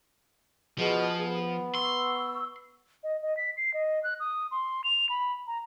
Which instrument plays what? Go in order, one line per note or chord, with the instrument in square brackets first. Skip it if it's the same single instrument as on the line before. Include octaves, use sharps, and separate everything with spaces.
[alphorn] B2 [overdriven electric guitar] F3 [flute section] G#4
[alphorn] B3
[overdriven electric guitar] C6 [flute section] C#6 E6
[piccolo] D#5
D#5
B6
C7
D#5
F#6
D#6
C6
F7
B5
A#5